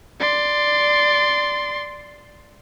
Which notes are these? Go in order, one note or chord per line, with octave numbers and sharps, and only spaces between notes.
D5 C6